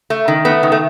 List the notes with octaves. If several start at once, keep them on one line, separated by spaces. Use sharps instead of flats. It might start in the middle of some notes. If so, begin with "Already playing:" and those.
A3
D#3
A3 B3
D#3
A3